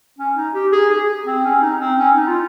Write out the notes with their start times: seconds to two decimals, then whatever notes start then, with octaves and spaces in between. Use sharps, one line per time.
0.18 C#4
0.37 D#4
0.54 G4
0.73 G#4
0.90 G#4
1.26 C4
1.45 C#4
1.62 D#4
1.80 C4
1.98 C#4
2.16 D#4
2.28 F4